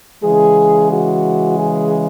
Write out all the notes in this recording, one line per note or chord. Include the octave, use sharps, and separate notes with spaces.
C#3 E3 G#3 G#4
F#4
G#4